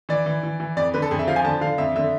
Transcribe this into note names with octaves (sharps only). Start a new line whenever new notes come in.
E3 D5
E3
E3
E3
F2 D5
D3 B4
A4
F2 G#4
E5
F3 F5
G#5
D3 A5
D3 F5
F2 E5
D3 E5